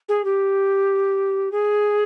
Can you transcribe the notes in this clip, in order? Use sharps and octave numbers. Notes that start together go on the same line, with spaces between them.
G#4
G4
G#4